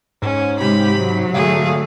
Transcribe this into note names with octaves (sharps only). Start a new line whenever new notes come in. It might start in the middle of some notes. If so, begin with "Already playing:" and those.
G#2 C#4
C3 G#3 G4 B5
F#3
D3 A3 G#4 F5